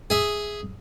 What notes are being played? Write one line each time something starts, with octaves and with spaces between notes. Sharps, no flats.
G#4 E5